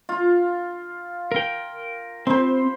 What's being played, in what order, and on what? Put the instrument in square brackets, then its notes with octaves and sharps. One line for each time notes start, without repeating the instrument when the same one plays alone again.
[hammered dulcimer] F4
[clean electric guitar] A#4 G5
[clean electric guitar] C4 [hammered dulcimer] C5 B5 C6